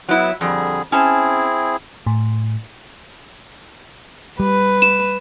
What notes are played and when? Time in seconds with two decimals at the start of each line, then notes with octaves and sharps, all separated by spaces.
0.09 F#3 B3 E4
0.41 F2 D3 G3 G#4
0.92 C4 C#4 E4 G#4 A5
2.06 A2
4.40 G3 B4
4.82 E7